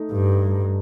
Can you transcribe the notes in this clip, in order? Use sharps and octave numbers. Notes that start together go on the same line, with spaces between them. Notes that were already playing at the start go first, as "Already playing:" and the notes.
Already playing: A3 D#4
G2